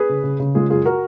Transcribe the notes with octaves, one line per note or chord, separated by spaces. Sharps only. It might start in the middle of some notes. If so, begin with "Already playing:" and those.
Already playing: G#4 B4
C#3
C#3
C#3
G#3 F4 G#4
F#2 F4 G#4
F#4 A#4